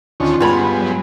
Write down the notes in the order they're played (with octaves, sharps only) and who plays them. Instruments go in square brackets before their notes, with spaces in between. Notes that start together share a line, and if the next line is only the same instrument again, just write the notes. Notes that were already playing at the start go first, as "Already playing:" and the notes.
[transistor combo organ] D2 D#3 C#5 [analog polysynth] C#4 D4 F4
[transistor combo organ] G2 G#3 B3 [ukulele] F4 C#5 B5 [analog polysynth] F#5
[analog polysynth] F#3